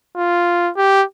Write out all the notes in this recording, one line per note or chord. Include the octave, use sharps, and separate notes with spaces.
F4
G4